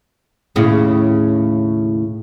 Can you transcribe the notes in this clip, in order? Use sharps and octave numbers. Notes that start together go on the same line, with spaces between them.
D#2 A2 C#3